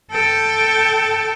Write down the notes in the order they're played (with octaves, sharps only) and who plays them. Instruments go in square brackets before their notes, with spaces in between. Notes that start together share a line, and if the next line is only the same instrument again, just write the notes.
[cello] A4 G5